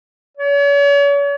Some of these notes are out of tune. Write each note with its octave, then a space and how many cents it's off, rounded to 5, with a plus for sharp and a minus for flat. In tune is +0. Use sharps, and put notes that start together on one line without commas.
C#5 +40